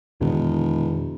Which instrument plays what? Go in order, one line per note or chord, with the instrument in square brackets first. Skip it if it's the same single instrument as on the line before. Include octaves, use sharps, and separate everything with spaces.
[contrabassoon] E1 [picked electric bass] F2 D3 D#3 [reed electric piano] B2